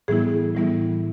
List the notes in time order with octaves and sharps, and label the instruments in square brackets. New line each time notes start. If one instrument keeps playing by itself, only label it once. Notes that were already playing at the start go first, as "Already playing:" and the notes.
[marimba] A2 E3 G3 B3 E4 G#4
A2 E3 G3 B3 E4